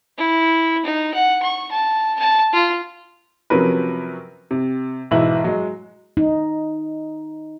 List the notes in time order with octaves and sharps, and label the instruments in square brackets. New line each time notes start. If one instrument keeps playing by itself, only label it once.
[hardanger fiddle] E4
D#4
F#5
C#6
A5
A5
F4
[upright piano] C3 F3 F#3 C#4 A#4 B4
C3
B1 G#2 E3 E4 F#7
F#3 G#3
[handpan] D#4